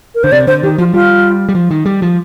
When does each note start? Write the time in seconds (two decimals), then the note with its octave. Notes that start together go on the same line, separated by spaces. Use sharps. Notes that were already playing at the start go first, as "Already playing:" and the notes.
0.15 A#4
0.24 D3 C5
0.32 C3 D5
0.47 D3 C5
0.63 D#3 G4
0.78 F3 F4
0.93 G3 F4
1.49 G3
1.55 F3
1.71 D#3
1.86 G3
2.02 F3